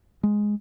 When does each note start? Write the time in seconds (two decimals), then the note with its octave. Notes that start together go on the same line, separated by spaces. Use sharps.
0.23 G#3